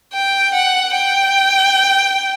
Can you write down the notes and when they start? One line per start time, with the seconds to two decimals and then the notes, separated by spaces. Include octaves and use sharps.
0.13 G5
0.54 F#5
0.95 G5